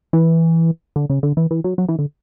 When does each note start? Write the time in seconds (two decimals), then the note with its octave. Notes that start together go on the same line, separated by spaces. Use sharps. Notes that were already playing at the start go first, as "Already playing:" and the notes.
0.13 E3
0.96 D3
1.10 C#3
1.23 D3
1.37 E3
1.51 E3
1.64 F#3
1.78 F#3
1.89 E3
1.99 D3